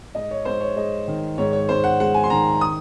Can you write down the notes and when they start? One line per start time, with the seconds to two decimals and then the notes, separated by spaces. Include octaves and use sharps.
0.14 G#2 D#5
0.31 C#5
0.45 G#2 C5
0.61 C#5
0.76 G#3 D#5
1.08 D#3
1.38 G#2 C#5
1.53 C#5
1.69 G#2 C5
1.84 F#5
2.00 G#3 F#5
2.14 G#5
2.24 C6
2.30 D#3 A#5
2.61 D#6